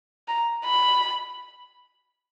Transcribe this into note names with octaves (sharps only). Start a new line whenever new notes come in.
A#5
B5